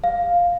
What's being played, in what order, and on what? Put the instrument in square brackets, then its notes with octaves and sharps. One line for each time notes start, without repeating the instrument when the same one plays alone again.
[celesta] F5